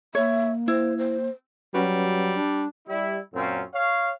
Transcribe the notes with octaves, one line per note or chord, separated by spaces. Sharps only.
A#3 C#5 E5
E4 C5
C5
F#3 G3 C#4 F#4 B4
D4
G3 E4
F#2 A#2 C4 C#4 F4
C#5 F5